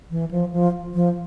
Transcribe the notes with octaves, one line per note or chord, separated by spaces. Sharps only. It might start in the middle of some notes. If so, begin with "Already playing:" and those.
E3
F3
F3
F3